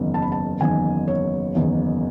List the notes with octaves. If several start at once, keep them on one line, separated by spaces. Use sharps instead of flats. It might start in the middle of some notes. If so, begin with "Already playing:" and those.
Already playing: F#1 E2 D#3
A5
B5
A5
F#1 E2 D#3 G#5
C#5
F#1 E2 D#3